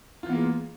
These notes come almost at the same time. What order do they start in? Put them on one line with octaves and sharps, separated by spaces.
F4 E3 B3 A#3 G#3